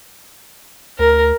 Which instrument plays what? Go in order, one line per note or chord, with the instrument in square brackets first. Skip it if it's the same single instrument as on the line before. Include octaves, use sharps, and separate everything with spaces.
[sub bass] D2 [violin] A#4